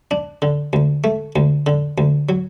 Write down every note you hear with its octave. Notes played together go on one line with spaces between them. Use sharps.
D4
D3
D2
A3
D2
D3
D2
F#3